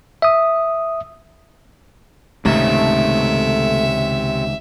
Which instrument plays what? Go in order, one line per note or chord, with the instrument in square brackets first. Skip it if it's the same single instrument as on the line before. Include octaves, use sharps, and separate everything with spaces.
[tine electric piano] E5 D#6
[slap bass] C#2 G#2 D#3 [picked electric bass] C3 [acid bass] A3 [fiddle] E5